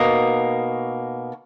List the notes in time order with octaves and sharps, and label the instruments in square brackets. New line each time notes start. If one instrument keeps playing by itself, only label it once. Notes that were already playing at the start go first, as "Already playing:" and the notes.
Already playing: [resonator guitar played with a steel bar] B2 A#3 D#4